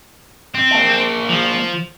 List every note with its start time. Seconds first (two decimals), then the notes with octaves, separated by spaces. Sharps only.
0.54 C4
0.72 A#3 A5
1.30 F3